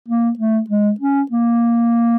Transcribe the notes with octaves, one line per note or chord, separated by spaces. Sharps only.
A#3
A3
G#3
C#4
A#3